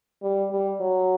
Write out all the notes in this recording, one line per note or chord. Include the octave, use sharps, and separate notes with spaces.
G3
G3
F#3